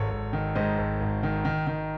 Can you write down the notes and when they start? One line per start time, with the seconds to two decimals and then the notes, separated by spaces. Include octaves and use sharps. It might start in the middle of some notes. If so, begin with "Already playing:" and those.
Already playing: G#1 G#2 A4 C#5
0.10 G#1
0.33 D#3
0.55 G#2 C5 D#5
0.78 G#1
1.00 G#1
1.23 D#3
1.45 D#3
1.67 D#3